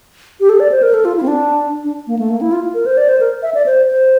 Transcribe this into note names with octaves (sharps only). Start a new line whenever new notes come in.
G4
A4
D5
C5
A#4
A4
F4
E4
C4
D4
D4
A#3
A3
A#3
E4
F4
A#4
C5
D5
C5
A#4
E5
D5
C5
C5